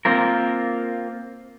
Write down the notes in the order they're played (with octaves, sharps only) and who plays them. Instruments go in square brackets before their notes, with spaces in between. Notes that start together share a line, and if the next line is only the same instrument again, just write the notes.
[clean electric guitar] A#3 C4 F4 A#4